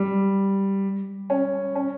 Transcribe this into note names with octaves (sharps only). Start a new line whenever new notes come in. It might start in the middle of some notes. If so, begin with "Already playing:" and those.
Already playing: G3
C#4
C#4